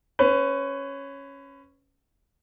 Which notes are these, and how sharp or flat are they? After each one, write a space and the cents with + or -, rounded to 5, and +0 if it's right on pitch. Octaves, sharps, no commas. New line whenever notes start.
C#4 -5 B4 +30